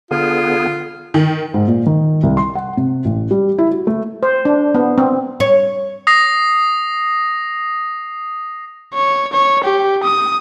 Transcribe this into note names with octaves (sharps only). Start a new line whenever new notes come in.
D3 B3 F4 G#4
D#3
G#2
A#2
D#3
C2
C6
F#5
C3
A1
G3
E4
F#4
A3
C5
D4
B3
C4
C#5
D#6 A#6 C7
C#5
C#5
G4
D#6